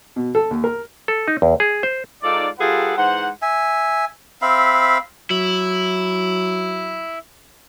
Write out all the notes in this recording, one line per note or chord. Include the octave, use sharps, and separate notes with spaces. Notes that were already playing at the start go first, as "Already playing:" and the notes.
B2
A4
D#2
A#4
A4
D#4
E2
G#4
C5
G#2 D#4 F4 A4 D5
G3 F4 G#4 A4 B4 F#5
G#2 E3 C5 F#5
E5 G#5
C4 E5 F5 B5
F#3 E4